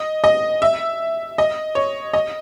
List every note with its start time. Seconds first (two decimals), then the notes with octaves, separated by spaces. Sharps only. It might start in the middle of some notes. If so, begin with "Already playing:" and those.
Already playing: D#5
0.24 D#5
0.62 E5
1.38 D#5
1.75 C#5
2.13 D#5